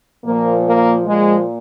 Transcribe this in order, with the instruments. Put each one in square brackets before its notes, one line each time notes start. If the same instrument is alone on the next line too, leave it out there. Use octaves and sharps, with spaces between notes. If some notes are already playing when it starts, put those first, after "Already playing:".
[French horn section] A#2 F3 A#3
A#3
A#2 F3 G#3